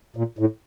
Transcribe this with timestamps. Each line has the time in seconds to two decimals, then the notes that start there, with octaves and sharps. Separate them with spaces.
0.16 A#2
0.39 A2